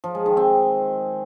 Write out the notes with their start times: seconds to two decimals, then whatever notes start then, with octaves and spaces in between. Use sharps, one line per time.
0.04 F3
0.15 G#3
0.26 D#3
0.37 C4